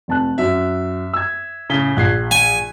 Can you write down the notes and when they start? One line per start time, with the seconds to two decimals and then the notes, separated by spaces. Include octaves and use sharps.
0.08 F1 A5 F#6
0.38 F#2 E5
1.13 E6 G#6
1.70 A2 C#3 B6 G7
1.97 A#1 F#6 G#6 C7
2.31 G#5